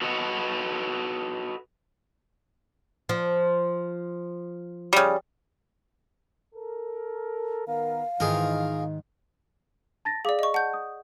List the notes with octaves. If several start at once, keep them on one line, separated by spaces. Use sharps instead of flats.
F#4 A4 B4 D#5 F#5
F3
C#3 G3
A4 A#4
D#3 B3 A#4 F5
G#2 D#3 E3 F4 G#4 A#4
A5 A6 A#6
G#4 D5 F5 D6
D#5 C#6
F#5 A5 G6
D#6